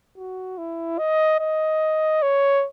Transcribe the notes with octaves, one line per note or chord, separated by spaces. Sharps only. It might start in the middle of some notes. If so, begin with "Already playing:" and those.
F#4
E4
D#5
D#5
C#5